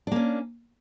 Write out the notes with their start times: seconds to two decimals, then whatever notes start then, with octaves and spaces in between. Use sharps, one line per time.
0.07 D4
0.12 A#3
0.16 C#4